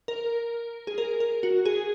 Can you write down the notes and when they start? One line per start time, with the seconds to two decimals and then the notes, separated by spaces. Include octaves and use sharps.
0.08 A#4
0.87 G#4
0.98 A#4
1.20 A#4
1.43 F#4
1.66 G#4